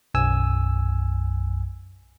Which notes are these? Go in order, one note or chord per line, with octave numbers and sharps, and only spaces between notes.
B1 F#2 G#5 E6